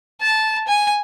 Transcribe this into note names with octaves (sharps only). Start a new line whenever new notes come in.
A5
G#5